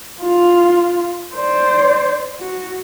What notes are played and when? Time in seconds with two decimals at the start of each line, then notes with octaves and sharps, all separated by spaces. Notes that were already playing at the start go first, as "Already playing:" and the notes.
0.22 F4
1.35 C5 D5
2.39 F#4